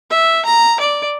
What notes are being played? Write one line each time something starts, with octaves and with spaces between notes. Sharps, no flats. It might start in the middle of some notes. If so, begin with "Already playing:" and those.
E5
A#5
D5